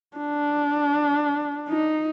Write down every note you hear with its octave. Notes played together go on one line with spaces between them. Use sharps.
D4
D#4